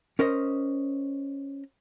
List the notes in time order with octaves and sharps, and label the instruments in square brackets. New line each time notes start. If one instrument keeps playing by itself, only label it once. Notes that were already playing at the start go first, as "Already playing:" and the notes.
[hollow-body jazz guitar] C#4 A#4 C5 D#5